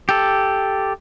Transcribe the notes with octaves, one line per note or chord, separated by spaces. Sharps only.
G4 A4